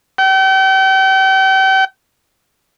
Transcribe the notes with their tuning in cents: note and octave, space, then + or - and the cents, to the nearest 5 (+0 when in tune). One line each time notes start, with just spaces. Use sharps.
G5 -40